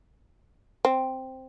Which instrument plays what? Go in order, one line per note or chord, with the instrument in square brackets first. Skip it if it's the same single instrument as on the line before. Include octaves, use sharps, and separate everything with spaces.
[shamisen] C4